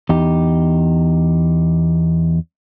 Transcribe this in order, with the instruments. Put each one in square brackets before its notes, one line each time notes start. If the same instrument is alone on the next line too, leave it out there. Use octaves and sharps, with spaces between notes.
[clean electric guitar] E2 D#4 G4